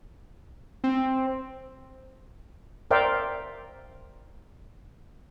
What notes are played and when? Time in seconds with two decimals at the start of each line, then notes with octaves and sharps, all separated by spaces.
0.84 C4
2.91 A#4 C5 D5 E5 F5 G5